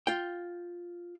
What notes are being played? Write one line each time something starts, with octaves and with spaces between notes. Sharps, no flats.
F4 G5